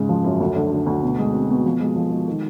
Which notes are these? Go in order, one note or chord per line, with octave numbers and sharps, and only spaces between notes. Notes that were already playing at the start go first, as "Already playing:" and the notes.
Already playing: G#2 C#3 G#3
F3
F#2
D2
D3
D3
D2
B2
G#3
C4
B2
F3
G#3
F3
G#3
D#3